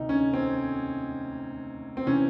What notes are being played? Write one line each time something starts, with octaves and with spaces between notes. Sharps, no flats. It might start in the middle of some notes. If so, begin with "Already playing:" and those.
Already playing: D2 C3 D#3 D#4
C#4
C4
C4
C3 E3 C#4